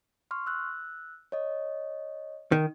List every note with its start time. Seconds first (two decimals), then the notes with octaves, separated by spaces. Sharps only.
0.31 C6 C#6 F6
0.47 E6 F#6
1.32 C#5 D#5
2.52 D#3